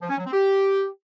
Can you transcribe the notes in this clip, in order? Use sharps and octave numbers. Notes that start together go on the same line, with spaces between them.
F3
C#4
F#3
C4
G4